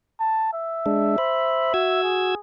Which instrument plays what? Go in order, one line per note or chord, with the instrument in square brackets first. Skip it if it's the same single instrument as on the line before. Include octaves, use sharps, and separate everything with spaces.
[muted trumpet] A5
E5
[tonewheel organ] G#3 D4
C5 B5
F#4 E6 G#6
[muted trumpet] G#4